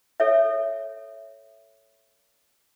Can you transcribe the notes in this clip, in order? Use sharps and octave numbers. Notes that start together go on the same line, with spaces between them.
A4 C#5 E5